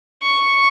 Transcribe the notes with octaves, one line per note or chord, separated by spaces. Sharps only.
C#6